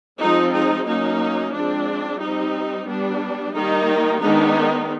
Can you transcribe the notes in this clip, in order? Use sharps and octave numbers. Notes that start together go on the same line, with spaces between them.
F3 G#3 C4 D#4
D#4
F#3 A#3 C#4 D#4
F3 G#3 C4 D4
G3 C4 D#4
G3 B3 D4
D#3 G3 A#3 D#4
D#3 G#3 B3 D4 D#4